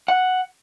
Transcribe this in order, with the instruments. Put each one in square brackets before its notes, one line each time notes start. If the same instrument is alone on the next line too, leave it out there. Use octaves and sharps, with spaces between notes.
[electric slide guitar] F#5